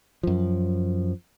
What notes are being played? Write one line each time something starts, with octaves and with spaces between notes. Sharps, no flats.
F#2 F3